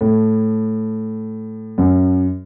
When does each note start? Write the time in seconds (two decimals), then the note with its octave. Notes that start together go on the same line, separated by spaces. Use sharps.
0.01 A2
1.78 F#2